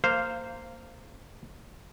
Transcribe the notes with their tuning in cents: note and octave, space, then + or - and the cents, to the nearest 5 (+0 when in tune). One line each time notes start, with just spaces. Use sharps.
A#3 -20 C5 -5 F5 -5